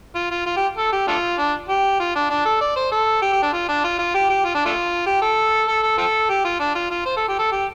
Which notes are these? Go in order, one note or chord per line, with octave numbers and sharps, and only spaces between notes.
F4
F4
F4
G4
A4
G4
A3 D4 F4
D4
G4
F4
D4
D4
A4
D5
C5
A4
G4
G4
D4
F4
D4
F4
F4
G4
G4
F4
D4
A3 D4 F4
G4
A4
A4
A4
C4 F4 A4
G4
F4
D4
F4
F4
C5
A4
G4
A4
G4